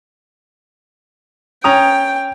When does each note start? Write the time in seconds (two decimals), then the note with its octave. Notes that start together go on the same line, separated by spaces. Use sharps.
1.64 C#4 G5 A#5 D#6